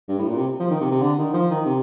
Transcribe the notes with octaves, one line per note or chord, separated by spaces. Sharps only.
G2
A2
A#2
C3
F3
D#3
C3
C3
D3
D#3
F3
D#3
C3